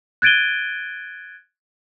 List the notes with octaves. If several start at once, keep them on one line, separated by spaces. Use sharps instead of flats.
F#6 G#6 A6 D7 D#7 G7